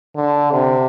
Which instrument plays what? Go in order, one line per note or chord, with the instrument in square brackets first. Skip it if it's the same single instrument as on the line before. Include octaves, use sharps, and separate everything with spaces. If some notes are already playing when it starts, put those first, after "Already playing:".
[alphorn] D3
C3